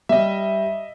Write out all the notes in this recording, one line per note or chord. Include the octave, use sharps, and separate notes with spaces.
G3 D#5 E5